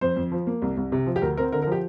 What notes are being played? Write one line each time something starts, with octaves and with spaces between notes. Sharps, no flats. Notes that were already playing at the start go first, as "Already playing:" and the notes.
F2 C5
F2
F3
A#3
C2
C2
C3
F3
G4
D2 A#4
C4 A#4
D3 A#4
A#4
F3
G4